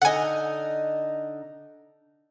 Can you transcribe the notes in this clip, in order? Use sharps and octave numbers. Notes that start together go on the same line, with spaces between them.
D3 D#4 F#5 G#5